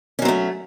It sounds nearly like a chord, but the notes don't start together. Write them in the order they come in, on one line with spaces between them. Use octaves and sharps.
C#4 F#3 C4 A3